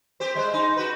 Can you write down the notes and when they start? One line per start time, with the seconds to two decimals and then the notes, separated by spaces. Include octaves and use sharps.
0.20 C4 G4 C5
0.35 G3 G#3 C5
0.54 D#4
0.77 F#4 B4